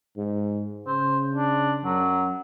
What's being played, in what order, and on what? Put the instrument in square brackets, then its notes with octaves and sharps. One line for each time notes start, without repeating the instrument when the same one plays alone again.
[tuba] G#2
[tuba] C#3 [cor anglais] C5
[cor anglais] D4
[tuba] F#2 [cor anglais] F#3